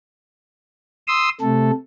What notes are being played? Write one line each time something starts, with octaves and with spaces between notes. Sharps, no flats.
C6 D#6 E6
C3 A3 A4